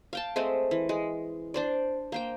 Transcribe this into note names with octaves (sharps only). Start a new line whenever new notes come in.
F5 G5 A5
G#3 A3 C4
E3
G#3
D4 C5 D5
A#3 C5 G5